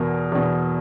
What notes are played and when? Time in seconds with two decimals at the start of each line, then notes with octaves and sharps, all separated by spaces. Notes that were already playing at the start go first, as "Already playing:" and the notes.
Already playing: E2 B2 A#4
0.32 E2 B2